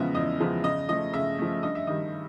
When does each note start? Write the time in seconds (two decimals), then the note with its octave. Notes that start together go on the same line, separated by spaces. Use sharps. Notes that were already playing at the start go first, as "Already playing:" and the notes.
Already playing: E2 C#3 F3 G#3 B3 D#5 E5
0.15 E2 D#5
0.40 C#3 F3 G#3 B3
0.64 C#3 D#5
0.89 F3 A3 D#5
1.13 C#3 E5
1.39 F3 A3
1.63 G2 D#5
1.75 E5
1.87 D#3 G3 D#5